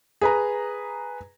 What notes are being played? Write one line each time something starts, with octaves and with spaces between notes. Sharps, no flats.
G#4 B4 A#5